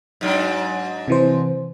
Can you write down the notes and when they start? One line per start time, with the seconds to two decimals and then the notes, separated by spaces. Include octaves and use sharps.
0.21 G#2 F#3 D4
1.08 C3 E3 C5